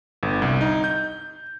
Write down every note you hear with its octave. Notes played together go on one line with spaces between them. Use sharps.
G1
C2
D#4
G6